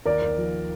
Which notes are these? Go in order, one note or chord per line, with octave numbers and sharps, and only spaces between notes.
D#2 A#4 D5
D#2
F3